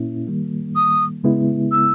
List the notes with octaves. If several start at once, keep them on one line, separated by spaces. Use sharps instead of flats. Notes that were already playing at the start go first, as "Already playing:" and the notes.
Already playing: A#2 A#3 C#4 E4
D#3 G3 A#3
D#6
C#3 G#3 B3 E4
E6